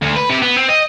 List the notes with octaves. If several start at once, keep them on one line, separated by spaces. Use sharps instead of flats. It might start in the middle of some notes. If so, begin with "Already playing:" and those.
D2
B4
C3 G4
B3
C4
D#5